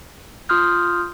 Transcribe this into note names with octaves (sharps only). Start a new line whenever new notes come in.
F4 C6 D#6 F6 G6